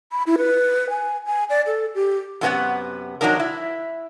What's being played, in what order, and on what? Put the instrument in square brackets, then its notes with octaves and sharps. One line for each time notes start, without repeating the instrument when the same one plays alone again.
[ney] B5
E4
B4
G#5
G#5
D5
A4
G4
[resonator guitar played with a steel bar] F#2 A2 C3 B3 C#4 F#5
C3 F#3 G3 D4 D#4 A#4
E4